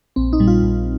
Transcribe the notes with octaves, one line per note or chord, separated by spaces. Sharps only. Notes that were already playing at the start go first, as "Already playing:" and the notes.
A#1 C4
D#4
A#2 G3
F4
A#1